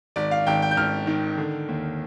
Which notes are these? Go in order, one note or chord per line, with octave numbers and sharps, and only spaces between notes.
G#1 D5
F5
G#1 G5
G5
G6
G#1 F6
D#3
D3
D#2